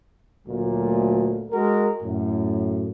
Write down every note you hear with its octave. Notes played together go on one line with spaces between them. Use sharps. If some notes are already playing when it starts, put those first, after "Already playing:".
D2 A#2 F#3 A3
G#3 F#4 A#4
F#2 A2